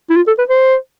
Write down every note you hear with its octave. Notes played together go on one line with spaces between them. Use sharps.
E4
F4
A4
B4
C5